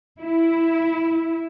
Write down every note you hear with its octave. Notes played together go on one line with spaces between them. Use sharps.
E4